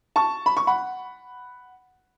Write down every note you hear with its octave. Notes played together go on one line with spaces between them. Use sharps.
A5 C#6
B5
C#6
F#5 B5